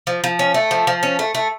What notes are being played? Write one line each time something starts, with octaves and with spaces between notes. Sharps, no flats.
F3
F3
C#4
A3
F3
F3
C#4
A3
A3